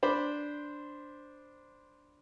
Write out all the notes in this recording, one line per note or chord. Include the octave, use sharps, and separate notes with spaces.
D4 C5 B5 D6